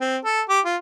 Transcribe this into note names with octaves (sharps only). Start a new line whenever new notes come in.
C4
A4
G4
F4